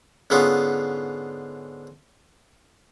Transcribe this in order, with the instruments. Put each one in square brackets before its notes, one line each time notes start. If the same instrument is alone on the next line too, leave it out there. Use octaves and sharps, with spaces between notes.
[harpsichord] G#2 D3 G#3 B3 C#4 F4